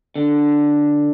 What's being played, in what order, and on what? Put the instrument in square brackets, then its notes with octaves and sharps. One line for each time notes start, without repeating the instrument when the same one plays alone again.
[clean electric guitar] D3